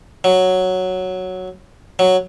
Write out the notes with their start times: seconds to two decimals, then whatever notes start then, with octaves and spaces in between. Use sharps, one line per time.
0.24 F#3
1.99 F#3